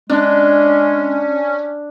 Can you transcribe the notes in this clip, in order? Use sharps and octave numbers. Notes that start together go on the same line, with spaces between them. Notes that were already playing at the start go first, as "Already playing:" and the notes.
G#3 C#4 D4